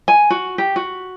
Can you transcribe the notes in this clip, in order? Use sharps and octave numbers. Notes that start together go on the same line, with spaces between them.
G#5
F#4
G4
F#4